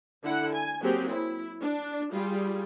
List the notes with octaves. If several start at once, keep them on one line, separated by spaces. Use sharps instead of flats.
D3 E4 F#5
G#5
F#3 A#3 C4 G4 G#4
E4
D4
G3 F4 G#4